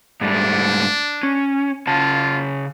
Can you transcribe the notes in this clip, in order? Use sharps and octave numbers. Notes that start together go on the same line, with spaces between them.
G#2 G3 A3 D4
C#4
C#3 C#4 F4 A5